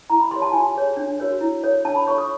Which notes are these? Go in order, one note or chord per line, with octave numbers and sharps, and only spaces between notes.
E4 A#5
B5
G4 A#4 C#5 C6
A5
F4 G#5
G#4 C#5
D4
F#4 A#4 C#5
E4
A4 C#5
D4 A5
B5
F4 A4 C#5 C#6
D#6